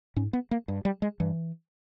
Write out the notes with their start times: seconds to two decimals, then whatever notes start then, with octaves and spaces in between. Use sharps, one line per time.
0.16 G#2 C#4
0.33 B3
0.51 A#3
0.68 G2
0.85 G3
1.02 G#3
1.20 G2 E3